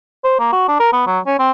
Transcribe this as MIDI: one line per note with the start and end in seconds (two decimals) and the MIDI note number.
0.24 0.37 72
0.39 0.49 58
0.52 0.66 66
0.68 0.76 62
0.80 0.93 70
0.93 1.03 59
1.07 1.20 54
1.26 1.34 61
1.39 1.51 60